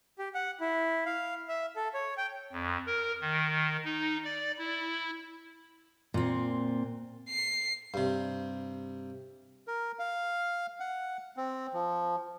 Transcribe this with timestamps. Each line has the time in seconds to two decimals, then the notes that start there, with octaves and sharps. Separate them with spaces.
0.19 G4
0.35 F#5
0.61 E4
1.06 F5
1.49 E5
1.76 A4
1.94 C#5
2.18 G5
2.52 F2
2.86 A#4
3.21 D#3
3.85 D#4
4.24 D5
4.58 E4
6.14 A#2 C4
7.29 C7
7.94 G2 C3
9.67 A#4
9.99 F5
10.80 F#5
11.37 C4
11.74 F3